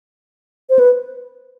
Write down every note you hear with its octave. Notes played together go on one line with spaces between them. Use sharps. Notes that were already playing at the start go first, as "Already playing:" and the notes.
C5
B4